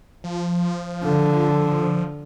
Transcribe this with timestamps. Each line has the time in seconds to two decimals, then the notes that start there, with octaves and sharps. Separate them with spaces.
0.24 F3
1.04 D3